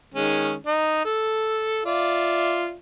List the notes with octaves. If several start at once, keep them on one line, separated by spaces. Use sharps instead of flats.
D#3 G#3 C#4
D#4
A4
F4 D5 E5